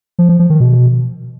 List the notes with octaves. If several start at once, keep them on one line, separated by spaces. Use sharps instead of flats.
F3
F3
F3
D#3
B2